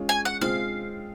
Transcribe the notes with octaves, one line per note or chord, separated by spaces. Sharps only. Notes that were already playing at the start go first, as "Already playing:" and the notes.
Already playing: G#3 C#4 F4
G#5
F#5
G#3 C4 F4 C5 F5